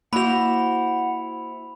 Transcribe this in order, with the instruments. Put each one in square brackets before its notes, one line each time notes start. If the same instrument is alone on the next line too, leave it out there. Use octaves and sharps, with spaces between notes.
[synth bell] A#3 F#4 [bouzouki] E4 C5 [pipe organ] F#5 [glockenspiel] B5 F7